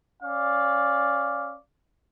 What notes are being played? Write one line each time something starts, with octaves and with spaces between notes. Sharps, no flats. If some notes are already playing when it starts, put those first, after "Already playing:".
C#4 D5 F5